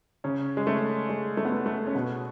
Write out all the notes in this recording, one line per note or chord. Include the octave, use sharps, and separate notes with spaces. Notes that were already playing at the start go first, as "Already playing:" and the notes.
C#3 C#4
G#3
A3
G#3
A3
B3
A3
A3
C#4
B2 B3